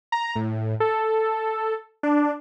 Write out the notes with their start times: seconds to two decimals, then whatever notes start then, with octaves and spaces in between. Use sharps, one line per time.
0.12 A#5
0.36 A2
0.80 A4
2.03 D4